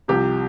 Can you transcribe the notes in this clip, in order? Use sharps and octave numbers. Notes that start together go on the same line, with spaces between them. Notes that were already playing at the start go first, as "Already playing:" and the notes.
C2 C3 F3 G4